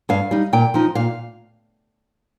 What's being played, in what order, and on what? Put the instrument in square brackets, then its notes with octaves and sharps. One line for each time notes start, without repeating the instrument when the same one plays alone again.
[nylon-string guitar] G2 F5
G3 D#4
A#2 G5
F3 D#4
A#2 F5